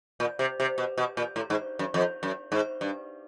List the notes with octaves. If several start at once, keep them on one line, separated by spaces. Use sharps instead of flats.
A#2
C3
C3
B2
B2
A#2
A2
G#2
F#2
F2
F#2
G#2
G2